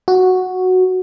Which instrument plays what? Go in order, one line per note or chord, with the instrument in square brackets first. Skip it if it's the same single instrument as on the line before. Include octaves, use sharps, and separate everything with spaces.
[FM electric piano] F#4